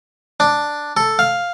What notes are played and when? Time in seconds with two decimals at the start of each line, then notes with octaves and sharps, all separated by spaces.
0.40 D4
0.97 A4
1.19 F5